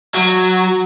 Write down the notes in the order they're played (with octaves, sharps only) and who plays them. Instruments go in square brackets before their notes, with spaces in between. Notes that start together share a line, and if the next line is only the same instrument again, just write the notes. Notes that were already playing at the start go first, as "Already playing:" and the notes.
[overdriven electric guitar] F#3